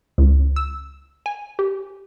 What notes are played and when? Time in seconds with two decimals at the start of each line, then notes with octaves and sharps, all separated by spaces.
0.18 C#2
0.56 E6
1.26 G#5
1.59 G4